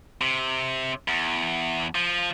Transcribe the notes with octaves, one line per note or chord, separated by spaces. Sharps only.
C3
E2
F3